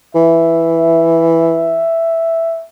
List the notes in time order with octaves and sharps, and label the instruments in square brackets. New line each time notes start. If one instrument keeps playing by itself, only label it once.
[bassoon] E3 [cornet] E5